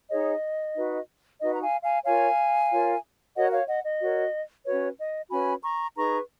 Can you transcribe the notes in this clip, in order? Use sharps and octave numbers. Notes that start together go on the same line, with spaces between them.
D#4 G#4 C#5 D#5
D#4 F#4 B4
D#4 F#4 B4 D#5
A#5
F5 G#5
F5 G#5
F4 A#4 C#5 F5 G#5
F4 A#4 C#5
F#4 A#4 C#5 D#5 F#5
C#5 F5
D#5 F#5
D#5
F#4 A#4 C#5
C#4 F#4 B4 C#5
D#5
C#4 F#4 B4 G#5 B5
A#5 C#6
D#4 G#4 B4 A#5 C#6